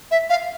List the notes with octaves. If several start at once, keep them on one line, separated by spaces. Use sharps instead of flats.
E5
F5